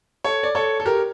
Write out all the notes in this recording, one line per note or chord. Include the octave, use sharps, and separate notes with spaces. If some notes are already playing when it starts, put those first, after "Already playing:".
A4 C#5
D5
A4 C#5
A4
G4 A#4